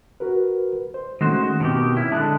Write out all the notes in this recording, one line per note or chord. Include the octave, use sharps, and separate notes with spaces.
F#4 A#4 B4
C5
D#3 G#3 A3 C#4 F#4 C5
B2 D#3 C4 G4
C#4 E4
D3 G#3 A5 F#6